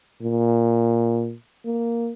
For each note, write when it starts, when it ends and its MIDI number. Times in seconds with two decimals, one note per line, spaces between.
0.22 1.34 46
1.65 2.12 58